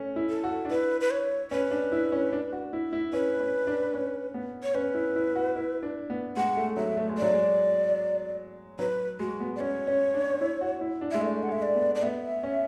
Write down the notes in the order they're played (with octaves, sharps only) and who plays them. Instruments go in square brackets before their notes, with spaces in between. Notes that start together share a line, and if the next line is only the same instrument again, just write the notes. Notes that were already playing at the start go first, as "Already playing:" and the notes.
Already playing: [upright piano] A3 C#4
E4
[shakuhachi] A4
[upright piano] F#4
D4
[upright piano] E4 [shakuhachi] B4
[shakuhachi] B4
C#5
[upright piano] C#4 [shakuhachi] B4
[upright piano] D4
E4
C#4
D4
F#4
E4
E4
[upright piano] C#4 [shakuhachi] B4
[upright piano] C#4
D4
C#4
B3
[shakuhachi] C#5
[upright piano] C#4 [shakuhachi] B4
[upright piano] E4
E4
F#4
E4
D4
B3
[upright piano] G#3 [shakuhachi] F#5
[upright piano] A3
[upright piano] F#3 [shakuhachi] E5
[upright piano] A3
G#3
[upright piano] F#3 [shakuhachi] D5
[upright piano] G#3
[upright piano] F#3 [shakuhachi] B4
[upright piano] G#3 [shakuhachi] F#4
[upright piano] B3
[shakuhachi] D5
[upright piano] C#4 [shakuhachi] C#5
[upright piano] C#4
D4
E4
F#4
E4
D4
[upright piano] G#3 [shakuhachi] E5
[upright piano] A3 [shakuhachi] D5
[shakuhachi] F#5
[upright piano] G#3
[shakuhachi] E5
D5
[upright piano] B3
[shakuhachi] D5
[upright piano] B3 [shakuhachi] E5
[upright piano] C#4